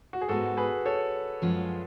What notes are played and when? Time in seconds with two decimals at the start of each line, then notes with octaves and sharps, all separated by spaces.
0.13 F#4
0.21 G#4
0.28 G#2 G#3 B3 F#4 A4
0.57 G#4 B4
0.86 A4 C#5
1.42 F#2 F3 G#3 C#4 F4